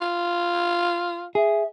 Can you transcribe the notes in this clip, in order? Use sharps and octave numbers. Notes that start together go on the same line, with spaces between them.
F4
G#4 E5